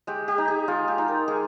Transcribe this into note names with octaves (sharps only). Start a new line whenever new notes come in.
G#3 G4
G4
D#4
G#4
G#3 F4
G4
D#4
A#4
G#3 G#4